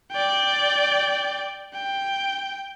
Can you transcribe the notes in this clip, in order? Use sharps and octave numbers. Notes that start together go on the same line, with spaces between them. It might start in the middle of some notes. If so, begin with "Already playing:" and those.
D5 G5
G5